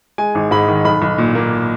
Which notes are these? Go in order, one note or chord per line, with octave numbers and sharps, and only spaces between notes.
G#3 G#5
G#1
G#2 B5
D#3
B1 B5
B1
A#2
A#3